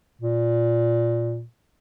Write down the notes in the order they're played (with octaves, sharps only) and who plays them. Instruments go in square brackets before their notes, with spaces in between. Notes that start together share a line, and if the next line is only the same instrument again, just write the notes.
[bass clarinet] A#2